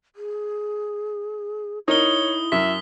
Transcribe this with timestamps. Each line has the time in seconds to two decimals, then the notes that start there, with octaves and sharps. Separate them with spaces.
0.16 G#4
1.88 D#4 E4 A#4 C#5 D#6 G7
2.52 F#2 E5 B6